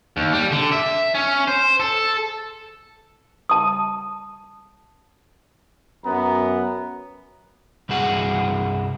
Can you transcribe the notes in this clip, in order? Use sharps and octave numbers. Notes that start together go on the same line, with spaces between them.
D#2
G3
D3
E5
C#4
C5
A4
A5 D#6
F#2 B3 A#5
C2 G2 E4 F#4 G#4 F#5